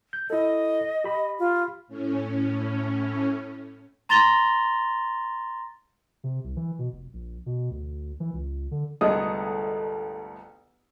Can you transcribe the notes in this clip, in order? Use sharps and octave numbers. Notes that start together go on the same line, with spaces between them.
G6
E4 A4 D#5
G4 B5
F4
A2 C#4
A#5 C6 A6 A#6 F7 G7
C3
C2
E3
B2
F1
A#1
B2
D2
E3
C#2
D3
G1 C2 G#3 A3 D#5 D#6